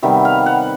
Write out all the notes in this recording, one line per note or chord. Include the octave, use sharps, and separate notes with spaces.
C3 D#3 G3 B3 E5
F5
F#5